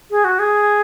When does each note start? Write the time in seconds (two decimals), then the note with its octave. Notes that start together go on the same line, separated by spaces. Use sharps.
0.11 G#4
0.24 F#4
0.39 G#4